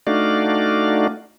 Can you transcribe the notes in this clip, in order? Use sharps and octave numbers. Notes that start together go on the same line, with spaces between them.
A3 D4 D#4 F#4 D5 F5